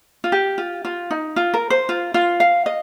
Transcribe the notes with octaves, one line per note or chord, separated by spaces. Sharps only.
F4
G4
F4
F4
D#4
F4
A#4
C5
F4
F4
F5
D#5